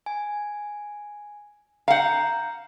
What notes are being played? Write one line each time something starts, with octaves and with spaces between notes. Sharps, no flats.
G#5
F5 F#5 A#5 G6